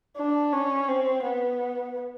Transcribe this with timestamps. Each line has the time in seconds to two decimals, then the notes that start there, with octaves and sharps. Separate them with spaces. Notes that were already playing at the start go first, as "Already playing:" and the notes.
0.17 D4
0.53 C#4
0.88 C4
1.24 B3